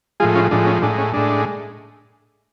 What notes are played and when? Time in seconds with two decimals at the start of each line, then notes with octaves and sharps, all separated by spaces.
0.20 A2 F3 G#3 F4 G#4
0.35 C#4 F4
0.51 A2 F3 G#3 D4
0.66 C#4
0.82 A2 G#3 D4
0.98 C#4
1.13 A2 G#3 D4